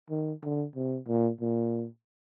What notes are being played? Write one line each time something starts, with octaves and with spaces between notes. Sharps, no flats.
D#3
D3
C3
A#2
A#2